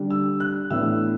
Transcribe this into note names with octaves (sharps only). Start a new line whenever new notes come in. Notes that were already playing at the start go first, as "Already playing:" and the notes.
Already playing: D3 G3 D4
E6
F#6
A2 E3 B3 D4 E6